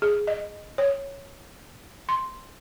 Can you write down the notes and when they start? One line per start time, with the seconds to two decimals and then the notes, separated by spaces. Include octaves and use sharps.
0.02 G#4
0.27 D#5
0.78 C#5
2.09 C6